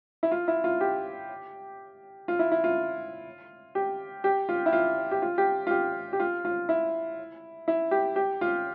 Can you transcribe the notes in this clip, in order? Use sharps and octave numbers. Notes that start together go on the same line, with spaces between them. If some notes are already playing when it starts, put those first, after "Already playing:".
E4
F4
E4
F4
G4
F4
E4
E4
F4
G4
G4
F4
E4
F4
G4
F4
G4
F4
G4
G4
F4
F4
E4
E4
G4
G4
F4